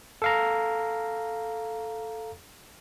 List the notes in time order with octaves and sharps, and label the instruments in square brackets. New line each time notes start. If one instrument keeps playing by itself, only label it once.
[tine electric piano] A4 F5 A#5